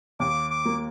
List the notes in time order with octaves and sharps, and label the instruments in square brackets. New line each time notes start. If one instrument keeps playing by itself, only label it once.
[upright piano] D#2 [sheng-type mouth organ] D6
[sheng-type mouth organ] D6
[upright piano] A#3